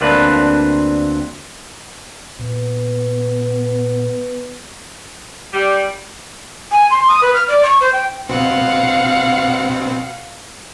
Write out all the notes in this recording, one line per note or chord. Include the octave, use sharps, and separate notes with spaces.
D2 A#3 C4 D4 B4
A#2 B3
G3
G#5
C6
D#6
B4
F6
D5
C#6
C5
G5
B2 C4 F5 F#5